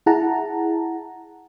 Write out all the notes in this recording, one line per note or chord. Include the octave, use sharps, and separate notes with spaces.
E4 G#4 F#5 A5 A#5